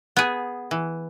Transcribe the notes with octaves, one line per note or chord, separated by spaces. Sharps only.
B3 G#4
E3